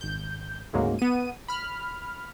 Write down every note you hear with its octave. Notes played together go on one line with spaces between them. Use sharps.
G#1 G6
D2 G#2 C#3 F#3 G#3 A#3
B3 D#7
B5 F6